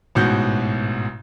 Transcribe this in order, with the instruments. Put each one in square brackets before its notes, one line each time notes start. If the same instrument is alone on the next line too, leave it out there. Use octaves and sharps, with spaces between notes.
[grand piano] A1 G#2 B2 F#4 G6